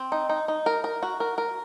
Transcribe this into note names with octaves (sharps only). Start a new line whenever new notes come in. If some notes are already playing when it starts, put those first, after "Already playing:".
Already playing: C4
D#4
D#4
D#4
A#4
A#4
F#4
A#4
A#4